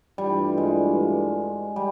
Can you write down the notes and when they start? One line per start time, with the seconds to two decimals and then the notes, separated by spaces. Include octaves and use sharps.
0.18 G2 E3 G3 A3 D4 F4
0.58 G#3
1.76 G3